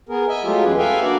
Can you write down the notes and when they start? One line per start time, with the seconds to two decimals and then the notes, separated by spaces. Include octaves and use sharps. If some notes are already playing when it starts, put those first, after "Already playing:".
0.09 B3 G#4 A#4
0.29 D#5 E5 G#5
0.44 F#3 G#3 A3 F4 G4
0.64 E2 C#4 G#4 B4
0.78 A4 B4 E5 F5 G5 G#5
1.02 A#3 D4 F#4 D5 F#5